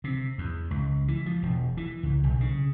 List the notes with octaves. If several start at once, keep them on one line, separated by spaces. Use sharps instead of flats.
C3
E2
C#2
E3
F3
E1
E3
C#2
B1
C#3